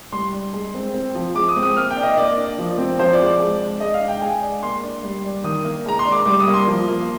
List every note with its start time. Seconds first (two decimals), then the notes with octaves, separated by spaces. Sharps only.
0.12 G3 C6
0.32 D4
0.53 G#3
0.74 C4
0.94 C4
1.15 F3
1.35 G#3 D6
1.48 D#6
1.56 C4
1.63 D#6
1.77 A#3 F6
1.91 G5
1.97 D4
2.03 D#5
2.18 A#3 D5
2.37 D4
2.58 F3
2.78 C4
2.99 F3 C5
3.13 D5
3.20 G#3
3.26 D5
3.40 G#3
3.60 D4
3.80 G#3 D#5
3.94 F5
4.01 D4
4.08 G5
4.21 G#3 G#5
4.42 D4
4.63 A#3 C6
4.83 D4
5.03 G3
5.24 D4
5.44 D#3 D#6
5.64 A#3
5.86 G#3 A#5
5.99 C6
6.05 D4
6.12 D6
6.26 G3 D6
6.40 D#6
6.47 A#3
6.54 C6
6.67 F3
6.88 A#3